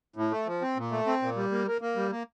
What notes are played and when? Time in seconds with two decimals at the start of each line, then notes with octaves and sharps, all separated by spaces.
0.16 A2
0.31 A3
0.47 F3
0.62 C4
0.77 A#2
0.92 A3
1.07 C4
1.22 A#2
1.36 G3
1.51 A#3
1.67 A#3
1.81 A#3
1.96 G3
2.11 A#3